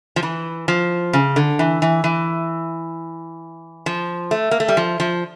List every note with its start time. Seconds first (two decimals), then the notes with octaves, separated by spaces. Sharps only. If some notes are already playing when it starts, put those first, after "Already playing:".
0.16 F3
0.23 E3
0.68 F3
1.13 C#3
1.36 D3
1.59 E3
1.82 E3
2.04 E3
3.86 F3
4.31 A3
4.51 A#3
4.60 A3
4.68 G3
4.77 F3
5.00 F3